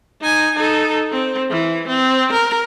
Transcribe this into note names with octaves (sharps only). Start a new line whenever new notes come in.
D#4 G#5
D#4 A4
C4
E3
C4
A#4